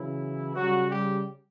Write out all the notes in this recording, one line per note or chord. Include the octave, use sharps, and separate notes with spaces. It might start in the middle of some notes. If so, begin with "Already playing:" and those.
Already playing: C#3 E3 F#3 E4
C#3 F#3 G3 F#4
G3 G4